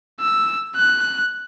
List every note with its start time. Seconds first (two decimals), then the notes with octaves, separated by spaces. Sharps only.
0.21 E6
0.76 F#6